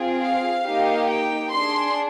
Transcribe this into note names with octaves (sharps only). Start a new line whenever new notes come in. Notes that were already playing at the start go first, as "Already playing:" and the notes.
Already playing: C4 F4 G#4
F5
A#3 D#4 G4
G5
D4 G#4 C6